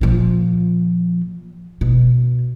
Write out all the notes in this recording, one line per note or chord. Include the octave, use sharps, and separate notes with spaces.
A#2 F3
B2